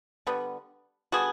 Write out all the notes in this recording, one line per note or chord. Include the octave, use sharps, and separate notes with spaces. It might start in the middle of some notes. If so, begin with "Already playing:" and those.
D3 G3 B3
D3 G3 B3 F#4 G#4